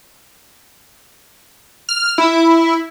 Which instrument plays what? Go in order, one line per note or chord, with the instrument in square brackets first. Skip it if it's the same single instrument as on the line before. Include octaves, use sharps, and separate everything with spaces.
[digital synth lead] F6
E4